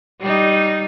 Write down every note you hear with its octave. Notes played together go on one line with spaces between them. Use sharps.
G3 D#4